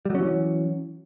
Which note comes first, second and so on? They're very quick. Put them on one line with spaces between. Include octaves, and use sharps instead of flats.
G3 F#3 C#4 E3